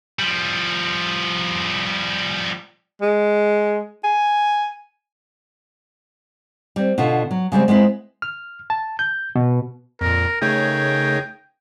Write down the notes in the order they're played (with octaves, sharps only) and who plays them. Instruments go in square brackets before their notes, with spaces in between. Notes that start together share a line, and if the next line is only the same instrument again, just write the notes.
[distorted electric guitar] F3 G3
[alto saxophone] G#3
G#5
[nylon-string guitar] G3 C4
B2 D3 F4
F#3
C#3 G3 G#3 C4
G#3 B3 C4 E4
[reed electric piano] F6
A5
G6
B2
[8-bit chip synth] F2 A#2 [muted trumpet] A#4
[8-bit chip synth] C#3 A3 C#5 [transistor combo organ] D#4 G#4 A#4 [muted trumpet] G5